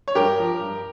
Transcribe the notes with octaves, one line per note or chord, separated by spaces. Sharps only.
C#5
G2 G4 A#4
F3
G2